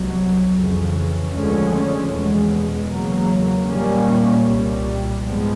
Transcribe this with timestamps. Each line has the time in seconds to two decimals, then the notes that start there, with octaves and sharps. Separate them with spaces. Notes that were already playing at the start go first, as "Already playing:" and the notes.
Already playing: C2 B2 F#3
0.52 F2 C#3 E3
1.30 D2 D3 F3 G#3 C#4
2.07 E2 B2 G#3
2.85 E2 C#3 F#3 A#3
3.64 A#2 G3 A#3 C#4
4.42 C2 A#2 G3
5.20 G#2 F3 G#3 B3